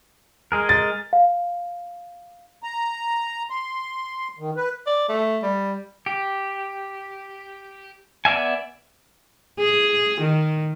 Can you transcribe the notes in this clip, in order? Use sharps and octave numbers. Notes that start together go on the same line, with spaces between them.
G#3 G#4 A#4
A6
F5
A#5
C6
D#3
B4
D5
A3
G3
G4
B3 D5 E5 G#5
G#4
D#3